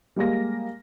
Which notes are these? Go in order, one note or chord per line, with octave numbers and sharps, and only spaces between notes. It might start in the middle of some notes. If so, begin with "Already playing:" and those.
G3 G#3 A#3 A#6